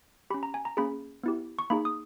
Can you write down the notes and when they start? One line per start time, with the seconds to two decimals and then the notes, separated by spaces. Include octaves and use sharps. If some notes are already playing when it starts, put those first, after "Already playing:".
0.30 G4 B5
0.34 C#4
0.43 A#5
0.54 G#5
0.65 A#5
0.77 A#3 C#4 G#4 B5
1.23 B3 E4 G4
1.59 C#6
1.70 A#3 D#4 G#4 B5
1.85 D#6